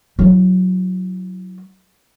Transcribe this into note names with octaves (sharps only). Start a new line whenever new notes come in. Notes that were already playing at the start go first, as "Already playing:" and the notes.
F#3 E4